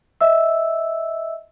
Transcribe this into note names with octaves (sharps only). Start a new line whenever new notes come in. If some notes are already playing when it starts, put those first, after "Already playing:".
D#5 E5 E6